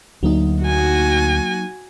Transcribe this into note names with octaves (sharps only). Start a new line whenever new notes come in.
D2 F#3 A#3 D#4
F#4 G#5